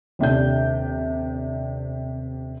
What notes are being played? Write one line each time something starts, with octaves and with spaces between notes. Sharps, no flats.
D#1 C3 D4 G6